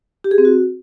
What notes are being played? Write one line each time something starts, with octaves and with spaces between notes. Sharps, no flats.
G4
G#4
C4
F#4